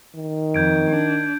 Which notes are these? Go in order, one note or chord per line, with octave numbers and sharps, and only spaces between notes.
D#3
F2 G6 G#6 D7
D4